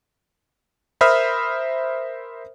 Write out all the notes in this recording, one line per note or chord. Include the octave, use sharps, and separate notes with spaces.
A#4 C5 E5 B5 D#6 F6